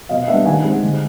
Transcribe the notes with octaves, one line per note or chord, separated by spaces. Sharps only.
B2 D#5 F5
G3 B3 D4 E5 F#5
D#3 F#5 G#5
G#3 C4
D3